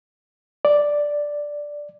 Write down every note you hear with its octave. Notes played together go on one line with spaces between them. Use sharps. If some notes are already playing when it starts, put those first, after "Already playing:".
D5